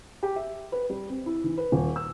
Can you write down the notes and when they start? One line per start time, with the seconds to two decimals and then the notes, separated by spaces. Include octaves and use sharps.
0.23 G4
0.36 E5
0.72 B4
0.90 G3
1.09 C4
1.26 E4
1.44 E3
1.58 B4
1.72 D#1
1.96 E6